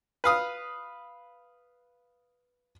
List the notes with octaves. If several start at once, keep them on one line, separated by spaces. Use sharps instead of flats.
B4 F5 D#6